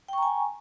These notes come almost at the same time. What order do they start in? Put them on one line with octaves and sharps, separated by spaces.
G5 C#6 A#5 G#5